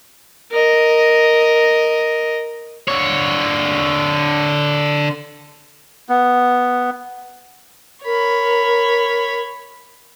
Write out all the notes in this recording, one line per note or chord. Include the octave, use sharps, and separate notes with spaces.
A#4 D#5
D3 C#5
B3
A#4 C#5 B5